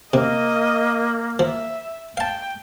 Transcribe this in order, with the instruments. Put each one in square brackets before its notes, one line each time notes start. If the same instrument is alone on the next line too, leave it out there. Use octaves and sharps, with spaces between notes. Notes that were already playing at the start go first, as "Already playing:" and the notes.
[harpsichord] C3 [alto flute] A#3 [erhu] D#5
[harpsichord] F3 [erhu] E5
[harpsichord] F5 A5 [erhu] G5